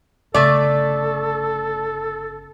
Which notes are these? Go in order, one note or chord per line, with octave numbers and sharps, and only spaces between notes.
G1 C#3 A3 A4 D5